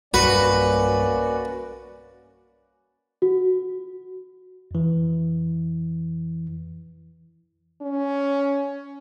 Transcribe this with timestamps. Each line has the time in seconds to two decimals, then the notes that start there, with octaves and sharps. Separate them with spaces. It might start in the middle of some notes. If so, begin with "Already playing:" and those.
0.14 B1 G2 G3 A#3 C#4 F#4 B4 D5
3.22 F#4
4.71 F2 E3
7.82 C#4